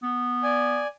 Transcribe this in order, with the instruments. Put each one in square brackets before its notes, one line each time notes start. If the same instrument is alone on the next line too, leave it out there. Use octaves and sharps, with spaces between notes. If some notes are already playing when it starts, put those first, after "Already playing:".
[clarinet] B3
[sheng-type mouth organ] D5 G#5